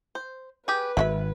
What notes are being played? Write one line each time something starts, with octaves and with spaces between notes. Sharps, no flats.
C5
G4 G#4 B4
G#1 F#3 F#4 E5 B5